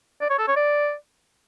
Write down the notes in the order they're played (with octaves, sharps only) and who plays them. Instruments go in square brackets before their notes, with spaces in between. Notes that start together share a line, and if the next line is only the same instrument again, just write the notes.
[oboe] D5
C#5
A4
C#5
D5